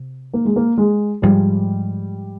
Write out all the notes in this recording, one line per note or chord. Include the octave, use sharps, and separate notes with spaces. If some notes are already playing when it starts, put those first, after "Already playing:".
Already playing: C3
A#3
G#3
A#3
G#3
G#2 F3 G3 G#3